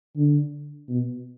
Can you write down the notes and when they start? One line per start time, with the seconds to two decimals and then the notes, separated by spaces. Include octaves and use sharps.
0.16 D3
0.89 B2